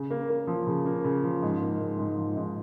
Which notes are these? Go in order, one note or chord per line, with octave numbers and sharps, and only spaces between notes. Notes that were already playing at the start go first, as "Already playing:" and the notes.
Already playing: C#3
A#3
A#3
F3
C#3
A#3
C#3
F3
G#2
A#3
G#2
G#2
F3
G#2